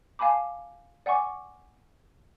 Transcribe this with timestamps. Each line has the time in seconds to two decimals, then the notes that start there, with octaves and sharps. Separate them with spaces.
0.19 F5 G#5 A5 B5 D6
1.06 D5 F#5 G#5 C#6 D6